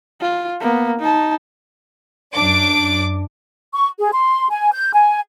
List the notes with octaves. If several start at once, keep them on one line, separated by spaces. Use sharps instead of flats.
F4
A#3 B3
D#4 A5
F#2 D4 D6
C#6
G#4
C6
G#5
G6
G#5